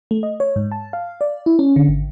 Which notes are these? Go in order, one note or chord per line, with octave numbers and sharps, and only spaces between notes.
A3
D#5
C#5
G#2
A5
F5
D5
E4
C#4
D3
G#1